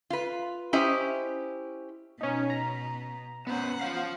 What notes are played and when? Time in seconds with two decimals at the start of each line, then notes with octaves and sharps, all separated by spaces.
0.10 F4 B4
0.73 C#4 E4 G4 C5 D#5
2.21 B2 B3 C#4 D#4
2.50 A#5
3.47 B3 C#4 C5 F#5
3.81 F4 C5 F5